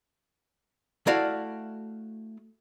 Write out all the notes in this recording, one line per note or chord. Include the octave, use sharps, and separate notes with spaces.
A3 E4 F#4 D5 F5